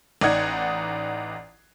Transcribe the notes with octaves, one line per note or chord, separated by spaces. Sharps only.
A1 D#4 D5 D#5 F#5 G#6